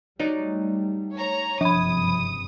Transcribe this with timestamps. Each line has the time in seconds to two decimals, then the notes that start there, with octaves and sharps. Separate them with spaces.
0.19 F#3 G3 A3 D#4 D5
1.15 C#5 A#5
1.61 F#1 G2 C3 F3 B5 D#6